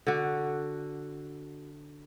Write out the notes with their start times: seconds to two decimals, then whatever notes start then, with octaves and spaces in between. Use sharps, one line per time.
0.07 D3 F#4